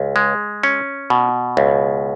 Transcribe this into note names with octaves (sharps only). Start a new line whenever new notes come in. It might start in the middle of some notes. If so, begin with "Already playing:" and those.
Already playing: C#2
G#3
C#4
B2
C#2